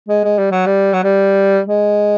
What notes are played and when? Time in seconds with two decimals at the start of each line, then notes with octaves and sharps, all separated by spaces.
0.09 G#3
0.24 G#3
0.38 G3
0.51 F#3
0.66 G3
0.93 F#3
1.04 G3
1.67 G#3